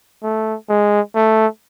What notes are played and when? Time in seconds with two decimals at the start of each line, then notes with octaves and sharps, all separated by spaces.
0.23 A3
0.69 G#3
1.15 A3